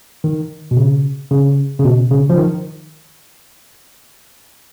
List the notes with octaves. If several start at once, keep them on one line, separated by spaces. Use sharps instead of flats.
D#3
B2
C#3
C#3
C#3
B2
C#3
F3
D#3